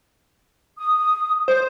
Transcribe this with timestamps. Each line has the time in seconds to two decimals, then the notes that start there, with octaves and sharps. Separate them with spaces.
0.78 D#6
1.48 C5